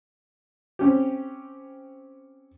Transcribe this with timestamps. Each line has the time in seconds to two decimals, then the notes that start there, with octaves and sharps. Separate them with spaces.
0.79 C4 C#4 G4